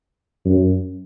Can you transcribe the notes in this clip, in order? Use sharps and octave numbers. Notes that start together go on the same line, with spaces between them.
F#2